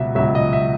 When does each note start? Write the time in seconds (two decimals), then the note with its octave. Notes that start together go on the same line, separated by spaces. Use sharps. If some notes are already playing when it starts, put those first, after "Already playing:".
Already playing: C#2 B2 F#3 E5
0.15 C#2 B2 F#3 E5
0.35 D#5
0.53 E5